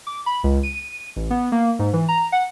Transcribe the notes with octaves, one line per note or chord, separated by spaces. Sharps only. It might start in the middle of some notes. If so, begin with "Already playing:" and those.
D6
B5
C#2
D#7
A1
B3
A#3
G#2
E3
A#5
F#5